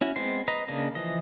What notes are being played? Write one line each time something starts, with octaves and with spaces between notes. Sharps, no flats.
C#4 E4 F#4
G#3 B3 C4 C6
B4 D#5 A#5
C#3 A#3 D4 D#5
E3 F3 D#5